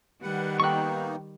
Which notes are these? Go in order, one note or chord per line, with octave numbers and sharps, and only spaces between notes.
D#3 G3 B4 F#5
A#3 B3 D#4 A4 B4 G5 C#6 F#6